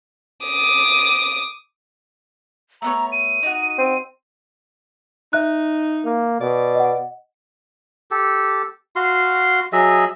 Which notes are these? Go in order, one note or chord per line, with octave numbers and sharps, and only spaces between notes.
D6 D#6
A3 B3 C#5 A#5
D#7
D#4 F#4
C4
D#4 E5 F#6
A#3
B2 D5
D#5 F#5
G4 A4
F#4 F5 C6
F#3 G#4 D#5 E5